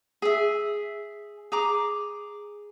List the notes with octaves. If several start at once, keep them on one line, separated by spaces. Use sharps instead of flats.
G#4 E5
G#4 A#5 D6